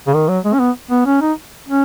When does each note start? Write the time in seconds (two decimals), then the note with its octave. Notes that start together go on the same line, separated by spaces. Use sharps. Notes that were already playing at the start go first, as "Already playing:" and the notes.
0.07 C#3
0.14 D#3
0.28 F#3
0.45 G#3
0.53 C#4
0.60 B3
0.91 B3
1.06 C#4
1.22 D#4
1.69 C#4